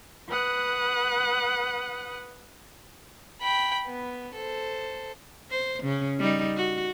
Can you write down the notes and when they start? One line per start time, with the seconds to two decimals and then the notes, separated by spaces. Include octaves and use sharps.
0.29 B4 F#5 D#6 F#6
3.41 G5 B5
3.86 B3
4.34 A4 C5
5.50 C5
5.83 C#3 C#4
6.19 G3 D#4
6.56 F#4